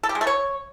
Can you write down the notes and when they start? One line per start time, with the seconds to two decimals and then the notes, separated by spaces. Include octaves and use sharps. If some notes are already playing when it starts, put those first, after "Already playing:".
0.03 A4
0.09 G4
0.15 G#3
0.21 A3
0.27 C#5